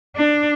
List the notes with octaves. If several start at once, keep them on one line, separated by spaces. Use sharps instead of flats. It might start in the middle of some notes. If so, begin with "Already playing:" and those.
D4